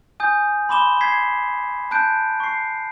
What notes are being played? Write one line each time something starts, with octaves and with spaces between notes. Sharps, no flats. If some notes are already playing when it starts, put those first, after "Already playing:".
G#5 D#6 G6
B5 C6 D6 E7 G7
G#6 B6 C7
A5 F#6 G6 D7
C#6 C7